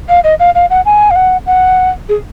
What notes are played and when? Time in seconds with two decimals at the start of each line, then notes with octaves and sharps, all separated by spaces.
0.09 F5
0.24 D#5
0.40 F5
0.55 F5
0.70 F#5
0.86 G#5
1.11 F5
1.16 F#5
1.47 F#5
2.09 G#4